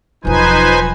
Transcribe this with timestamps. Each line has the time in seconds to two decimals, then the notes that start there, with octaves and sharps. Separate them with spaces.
0.25 E1 F3 F#3 D#4 B4 C5 G#5